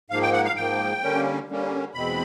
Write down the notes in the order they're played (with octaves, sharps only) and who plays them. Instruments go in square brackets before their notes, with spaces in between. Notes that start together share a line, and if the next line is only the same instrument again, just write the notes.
[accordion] G#2 F3 A#3 F5
G5
F#5
F5
G#2 F3 A#3 G5
D3 G3 A#3 C#4
D3 G3 A#3 C#4
E2 B2 G#3 C4 B5